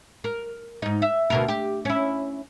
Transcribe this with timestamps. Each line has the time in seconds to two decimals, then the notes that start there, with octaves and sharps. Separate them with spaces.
0.24 A#4
0.82 G#2 D#4
1.02 E5
1.30 D2 B2 A#4
1.48 G4
1.85 C#4 E4